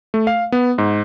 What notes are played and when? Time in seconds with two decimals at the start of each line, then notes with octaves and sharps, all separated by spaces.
0.14 A3
0.27 F5
0.52 B3
0.78 G#2